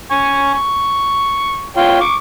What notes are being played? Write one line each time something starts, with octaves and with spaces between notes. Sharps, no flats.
G#5 C#6
C#6
F4 C#5 G5
C#6 D6